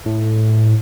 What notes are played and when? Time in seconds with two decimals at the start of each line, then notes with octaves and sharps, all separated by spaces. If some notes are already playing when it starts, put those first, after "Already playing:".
0.06 A2